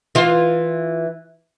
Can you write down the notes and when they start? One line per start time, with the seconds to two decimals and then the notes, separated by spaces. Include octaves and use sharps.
0.15 E3 F4